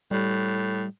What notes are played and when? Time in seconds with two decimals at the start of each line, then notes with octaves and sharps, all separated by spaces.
0.11 A2 G3